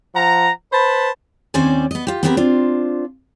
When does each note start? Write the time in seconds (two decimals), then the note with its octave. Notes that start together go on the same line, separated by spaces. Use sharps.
0.15 F3 F#5 A#5
0.73 B4 C5 A5 B5
1.54 D#2 C4 C#4 C5 D5 G#5
1.91 B3 D#5
2.07 F4 G4
2.23 B3 C4 E4 G4 A4 A#4
2.37 C4 D4 F4